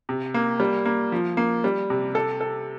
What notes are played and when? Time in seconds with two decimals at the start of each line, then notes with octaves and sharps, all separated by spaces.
0.09 C3
0.34 A#3
0.60 G3
0.85 A#3
1.12 F3
1.37 A#3
1.64 G3
1.90 C3
2.15 A4
2.41 A4